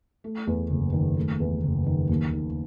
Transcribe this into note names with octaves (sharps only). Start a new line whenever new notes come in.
A3
E2
F#1
D#3
A3
E2
F#1
D#3
D#2
D#3